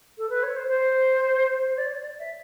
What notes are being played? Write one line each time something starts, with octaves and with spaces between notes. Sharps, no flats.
A4
B4
C#5
C5
C5
C5
D5
C#5
D5
E5